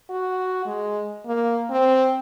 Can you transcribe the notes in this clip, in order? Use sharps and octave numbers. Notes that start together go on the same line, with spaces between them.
F#4
G#3
A#3
C4